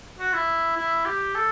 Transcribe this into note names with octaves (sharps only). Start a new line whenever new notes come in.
F#4
E4
E4
G4
A4